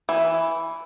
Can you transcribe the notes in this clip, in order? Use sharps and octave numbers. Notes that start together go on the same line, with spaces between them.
E3